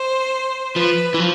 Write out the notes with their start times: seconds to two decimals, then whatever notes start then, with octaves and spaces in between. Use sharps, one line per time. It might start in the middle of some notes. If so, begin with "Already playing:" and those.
Already playing: C5
0.76 F3 B4
1.14 E3
1.20 F3